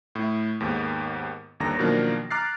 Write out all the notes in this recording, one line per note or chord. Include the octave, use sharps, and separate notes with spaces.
A2 E4
D#2 G#2 D#3 B3 D#4
G1 D#2 D3 A#5 A#6
B2 D#3 F3 F#3 A#3 D4
A#5 D6 F6 F#6 A6 C7